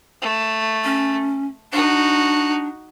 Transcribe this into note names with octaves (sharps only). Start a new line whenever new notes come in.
A3
C#4
D4 D#4 F#4